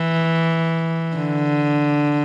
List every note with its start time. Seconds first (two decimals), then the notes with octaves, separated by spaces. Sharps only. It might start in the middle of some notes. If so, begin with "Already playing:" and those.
Already playing: E3
1.16 D3